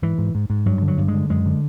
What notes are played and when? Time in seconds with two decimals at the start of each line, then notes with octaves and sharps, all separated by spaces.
0.02 G#2 E3
0.18 G#2
0.35 G#2
0.50 G#2
0.66 G2 F#3
0.82 D3
0.88 F#3
0.98 G2
1.08 G#3
1.14 D3
1.30 F#2 G#3
1.46 D3